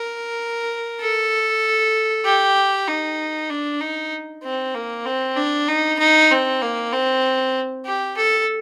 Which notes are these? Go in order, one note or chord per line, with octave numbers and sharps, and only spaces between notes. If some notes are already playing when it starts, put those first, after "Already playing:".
Already playing: A#4
A4
G4
D#4
D4
D#4
C4
A#3
C4
D4
D#4
D#4
C4
A#3
C4
G4
A4